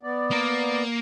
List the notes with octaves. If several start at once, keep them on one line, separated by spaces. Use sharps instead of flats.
B3 D5
A#3 A#4